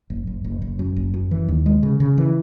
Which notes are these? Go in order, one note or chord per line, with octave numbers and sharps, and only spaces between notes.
F#1
F#1
F#1
F#1
F#2
F#1
F#2
E3
D#2
G#3
C#3
C#3
E3